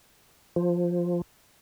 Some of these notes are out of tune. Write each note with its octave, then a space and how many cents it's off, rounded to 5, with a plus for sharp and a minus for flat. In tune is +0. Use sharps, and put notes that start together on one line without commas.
F3 +5